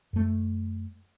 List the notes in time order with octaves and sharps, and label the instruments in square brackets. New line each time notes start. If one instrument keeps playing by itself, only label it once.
[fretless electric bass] F#2 A3